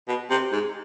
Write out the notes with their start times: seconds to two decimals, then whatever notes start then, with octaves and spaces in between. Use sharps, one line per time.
0.08 B2
0.30 C3
0.52 G#2